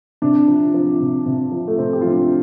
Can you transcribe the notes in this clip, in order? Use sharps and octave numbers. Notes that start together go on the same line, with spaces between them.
C3 D4
F3
F3
C3
C3
F3
A3
C3 C4
G4
F4
F3
D4
C4